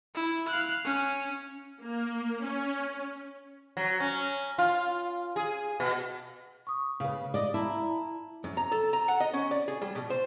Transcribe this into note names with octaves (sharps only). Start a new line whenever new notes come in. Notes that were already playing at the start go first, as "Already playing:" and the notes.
E4
F5 F#6
C#4
A#3
C#4
F#3
C#4
F4
G#4
B2
C#6 D#6
C#3 B4 F5
D5 D#5
E4 A5 A#5
F#2
A#5
A4
A#5
F#5
D#5
C#4
D5
G#4
G3
B2
C5